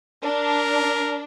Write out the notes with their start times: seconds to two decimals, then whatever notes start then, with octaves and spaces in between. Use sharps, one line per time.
0.24 D4 A#4